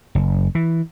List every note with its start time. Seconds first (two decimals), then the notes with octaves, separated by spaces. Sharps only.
0.15 F#1
0.55 E3